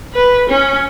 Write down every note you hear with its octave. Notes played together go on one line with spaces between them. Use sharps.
B4
C#4